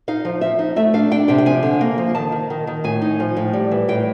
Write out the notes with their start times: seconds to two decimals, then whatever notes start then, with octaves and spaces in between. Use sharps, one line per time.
0.08 D#4 F5
0.25 F3
0.41 F3 E5
0.59 D#4
0.76 A3 E5
0.93 D4 F5
1.11 D4 G5
1.28 C3 G5
1.38 G5
1.46 F3 G#5
1.63 D3
1.81 A#3
1.98 F3
2.15 D#3 A5
2.32 D#3
2.50 D#3
2.67 D#3
2.84 A2 G#5
3.02 D#4
3.20 F3
3.37 A2
3.53 G3
3.71 E3
3.88 A2 G5